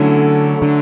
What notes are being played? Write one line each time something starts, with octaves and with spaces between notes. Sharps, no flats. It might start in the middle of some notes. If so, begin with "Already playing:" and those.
Already playing: D3 F#3 A3 C#4 E4
D3